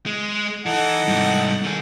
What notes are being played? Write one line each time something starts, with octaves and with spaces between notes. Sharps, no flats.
G#3
E3 D#4 A4 F#5
G#2 C3 G3
D#3 G#4